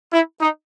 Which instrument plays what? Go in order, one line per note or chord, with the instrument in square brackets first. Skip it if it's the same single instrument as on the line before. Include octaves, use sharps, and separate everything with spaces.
[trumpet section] E4
D#4